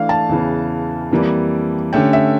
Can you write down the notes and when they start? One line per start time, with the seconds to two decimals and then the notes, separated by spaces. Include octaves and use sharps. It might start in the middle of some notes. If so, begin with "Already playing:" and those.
Already playing: E3 A3 D4 F5
0.09 A5
0.29 E2 C#3 E3
1.11 F2 E3 G3 A#3
1.93 D3 A3 C#4 G4 G5
2.13 E5